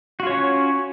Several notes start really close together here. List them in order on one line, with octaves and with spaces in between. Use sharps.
F#4 F4 C#5 C#4